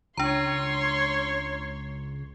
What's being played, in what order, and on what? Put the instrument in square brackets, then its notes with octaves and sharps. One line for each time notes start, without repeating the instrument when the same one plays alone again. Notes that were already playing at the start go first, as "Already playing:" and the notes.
[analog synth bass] C#2 [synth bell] D4 A#5 [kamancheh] C#5 C6